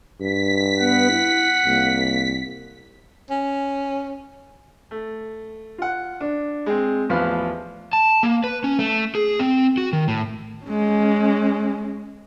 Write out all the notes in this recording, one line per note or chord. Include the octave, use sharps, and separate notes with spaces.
G2 B6
B3 F#5
E4
C2 A#3
C#4
A3
F4 F#5
D4
G#3 C4
A1 E2 F3 B4 F5
A5
A#3
B4
C#4
A3
G#4
C4
F#4
D#3
A2
G#3 C#4